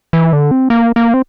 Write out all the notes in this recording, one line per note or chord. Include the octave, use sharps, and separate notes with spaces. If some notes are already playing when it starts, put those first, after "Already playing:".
E3
D3
C4
A#3
A#3
C4